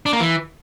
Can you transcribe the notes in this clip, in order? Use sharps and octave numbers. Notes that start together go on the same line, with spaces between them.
D4
A#3
E3